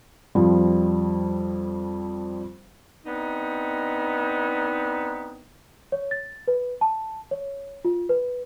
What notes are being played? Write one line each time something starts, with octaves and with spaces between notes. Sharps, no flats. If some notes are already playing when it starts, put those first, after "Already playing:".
F2 F3 G3
B3 C4 D4 D#4
C#5
A6
B4
A5
C#5
F4
B4